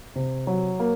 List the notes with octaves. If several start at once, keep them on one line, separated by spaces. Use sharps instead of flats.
C3
F#3
A#3